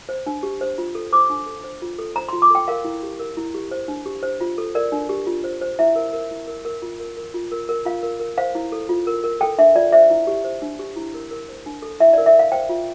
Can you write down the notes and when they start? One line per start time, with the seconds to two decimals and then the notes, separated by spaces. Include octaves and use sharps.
0.09 C5
0.26 D4
0.43 G4
0.61 C5
0.78 F4
0.95 A4
1.13 C5 D6
1.30 D4
1.47 A4
1.64 C5
1.82 F4
1.99 A4
2.16 C5 A#5
2.29 C6
2.33 F4
2.42 D6
2.50 A4 G5
2.68 A#4 F5
2.85 E4
3.03 G4
3.20 A#4
3.37 E4
3.54 G4
3.71 C5
3.88 D4
4.06 G4
4.23 C5
4.41 F4
4.58 A4
4.75 A#4 D5
4.92 D4
5.09 G4
5.27 F4
5.44 C5
5.61 C5
5.79 E4 E5
5.96 A#4
6.13 A#4
6.31 E4
6.47 A#4
6.65 A#4
6.82 F4
7.00 A#4
7.17 A#4
7.34 F4
7.52 A#4
7.69 A#4
7.85 F4 F5
8.03 A#4
8.20 A#4
8.38 C5 F5
8.55 E4
8.72 A4
8.89 F4
9.07 A#4
9.24 A#4
9.41 A4 G5
9.58 D4 E5
9.75 F4 D5
9.93 C5 E5
10.10 E4
10.27 G4
10.44 C5
10.62 D4
10.79 G4
10.96 E4
11.14 A#4
11.31 A#4
11.49 C5
11.66 D4
11.82 A4
12.00 E4 E5
12.13 D5
12.18 A#4
12.26 E5
12.34 A#4 F5
12.52 C5 G5
12.69 F4